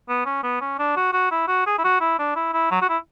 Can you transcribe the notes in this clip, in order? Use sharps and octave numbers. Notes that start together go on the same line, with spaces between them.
B3
C#4
B3
C#4
D4
F#4
F#4
E4
F#4
G#4
E4
F#4
E4
D4
E4
E4
F#3
F#4
E4